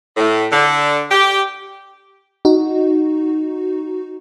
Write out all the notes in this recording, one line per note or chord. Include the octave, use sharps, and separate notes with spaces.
A2
D3
G4
D#4 F#4